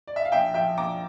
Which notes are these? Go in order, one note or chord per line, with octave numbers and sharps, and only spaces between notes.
D5
E5
F5
A#1 E5 G5
F3 E5 G5
A#1 A#5 D6